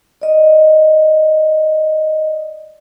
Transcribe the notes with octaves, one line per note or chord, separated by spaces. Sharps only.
D5 D#5